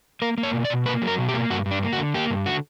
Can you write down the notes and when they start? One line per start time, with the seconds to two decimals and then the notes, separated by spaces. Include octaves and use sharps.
0.22 A#3 A#4
0.38 A#3
0.43 C#5
0.53 B2
0.65 D5
0.70 B2
0.86 A#3 B4
1.02 F#3
1.07 A#4
1.18 B2
1.29 G4
1.34 A#3
1.50 G2 F#4
1.66 G2
1.71 D4
1.83 A#3
1.93 F#4
1.98 D3
2.14 A#3 G4
2.30 G2
2.46 D3 F#4